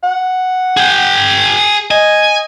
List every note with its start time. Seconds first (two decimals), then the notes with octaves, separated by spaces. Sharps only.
0.03 F#5
0.77 G#4 G5
1.91 D#5 G#5